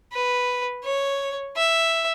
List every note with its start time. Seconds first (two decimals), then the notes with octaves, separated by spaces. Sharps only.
0.13 B4
0.84 C#5
1.57 E5